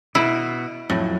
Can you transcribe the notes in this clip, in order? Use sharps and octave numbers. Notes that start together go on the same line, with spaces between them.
B2 E4
F2 A2 F#3